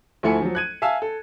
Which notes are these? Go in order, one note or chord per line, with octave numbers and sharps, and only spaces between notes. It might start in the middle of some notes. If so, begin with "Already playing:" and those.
D2 F3 A3 E4 G#5 C#7
F3 F#3
F#6 G#6 D#7
E5 F5 G#5 A5 E6
A4